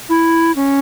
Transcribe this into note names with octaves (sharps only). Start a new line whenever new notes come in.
E4
C#4